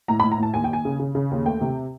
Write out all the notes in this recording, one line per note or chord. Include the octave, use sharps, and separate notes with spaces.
A2 A#5
B5
A2
A#5
A2 A5
D#2 G#5
G5
D#2 G#5
C#3
C#3
C#3
D#2
A3 G5
C3